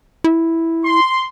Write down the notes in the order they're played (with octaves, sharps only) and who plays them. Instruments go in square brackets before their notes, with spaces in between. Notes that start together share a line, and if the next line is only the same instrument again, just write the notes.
[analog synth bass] E4
[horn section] C6